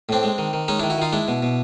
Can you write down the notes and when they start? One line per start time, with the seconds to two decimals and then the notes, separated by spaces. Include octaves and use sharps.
0.09 A2 C4 D4
0.23 G#3
0.38 D#3
0.53 D#3
0.68 G#3 C#4 D#4
0.79 D4 E4
0.83 D#3
0.90 E4 F#4
0.98 D#3 D#4 F4
1.12 G#3 D4 E4
1.28 B2
1.42 B2